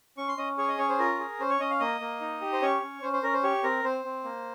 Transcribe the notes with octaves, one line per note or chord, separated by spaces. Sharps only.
C#4 C#6
C6
C#4 D#5
G#4 C#5
D#5
C#4 C#5
C5
F4 A#4
G#4
C#4 C5
C#5
C#4 D#5
F5
A#3 D#5
A#3
D#4
G4
C5
C#4 C#5
C#4
C#4 C5
C5
C#4 A#4
C5
G4 C#5
C4 A#4
C4 C5
C4
A#3